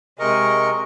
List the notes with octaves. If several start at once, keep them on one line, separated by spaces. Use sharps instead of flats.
C3 G#3 A#4 D#5 C#6